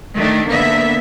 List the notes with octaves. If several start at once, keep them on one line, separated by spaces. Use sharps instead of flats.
D#3 A3 D4
D3 A#3 B3 E5